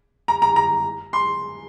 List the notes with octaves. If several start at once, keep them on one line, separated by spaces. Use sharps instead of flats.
A#5
A#5
A#5
C6